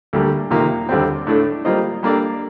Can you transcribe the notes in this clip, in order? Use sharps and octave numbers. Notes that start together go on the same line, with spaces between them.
D2 D3 G3 A#3
F2 C3 D#3 A#3 F4
D#2 D3 G3 C4
A2 A3 D4 A4
G3 A#3 F4 C5 D#5
G3 A#3 D4 A4 D5